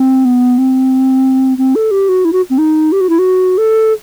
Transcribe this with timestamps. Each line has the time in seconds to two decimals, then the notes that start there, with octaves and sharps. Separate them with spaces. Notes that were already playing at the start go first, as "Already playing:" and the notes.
Already playing: C4
0.25 B3
0.58 C4
1.58 C4
1.75 A4
1.91 G4
2.09 F#4
2.25 E4
2.33 F#4
2.50 C4
2.58 D#4
2.92 G4
3.01 F#4
3.09 E4
3.19 F#4
3.58 A4